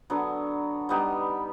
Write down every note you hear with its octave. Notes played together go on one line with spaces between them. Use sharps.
D3 F#3 B3
G3 B3 D#4 G4